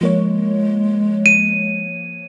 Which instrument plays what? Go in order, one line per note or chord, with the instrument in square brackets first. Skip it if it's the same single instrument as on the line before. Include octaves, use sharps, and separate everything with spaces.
[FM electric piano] F3 A#3 C#5 [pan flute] G#3
[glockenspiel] D#7